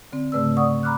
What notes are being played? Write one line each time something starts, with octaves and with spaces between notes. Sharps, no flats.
D3 C4
G#2 C#3 A3 B4 D5 E6
D5 F#5 C#6 D#6
A#5 B5 D6 F6 F#6